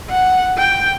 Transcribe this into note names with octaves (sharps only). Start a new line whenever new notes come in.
F#5
G5